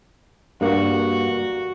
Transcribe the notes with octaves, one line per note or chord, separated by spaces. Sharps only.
G2 A#3 F#4